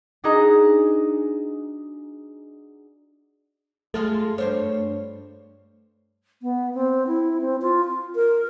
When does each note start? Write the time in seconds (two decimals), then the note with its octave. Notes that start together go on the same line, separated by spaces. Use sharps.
0.24 D4 D#4 F#4 G#4 D#5 A#5
3.94 G#3 A3 F4 A4
4.38 G2 C5 C#5
6.42 B3
6.74 C4
7.07 E4
7.41 C4
7.62 F4
7.85 F4
8.15 A#4